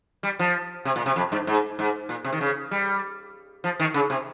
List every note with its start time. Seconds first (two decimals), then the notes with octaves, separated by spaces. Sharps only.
0.23 G3
0.39 F3
0.85 C3
0.96 A#2
1.06 C3
1.16 F2
1.32 G2
1.47 G#2
1.79 G#2
2.09 A#2
2.24 C3
2.32 D#3
2.41 C#3
2.71 G3
3.64 F3
3.80 D#3
3.94 C#3
4.10 C3